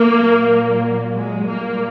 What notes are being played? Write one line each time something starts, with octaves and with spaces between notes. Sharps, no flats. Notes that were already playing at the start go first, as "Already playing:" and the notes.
Already playing: A#3
A#2 F#3
G#3
A#2 G3 A#3